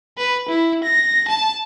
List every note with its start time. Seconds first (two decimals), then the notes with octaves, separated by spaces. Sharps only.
0.18 B4
0.49 E4
0.84 A#6
1.28 A5